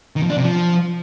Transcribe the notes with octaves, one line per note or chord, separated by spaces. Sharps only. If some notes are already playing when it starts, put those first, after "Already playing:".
D#3
F3
D4
C3
F3